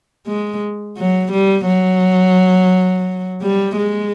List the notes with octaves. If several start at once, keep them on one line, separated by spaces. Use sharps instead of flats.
G#3
F#3
G3
F#3
G3
G#3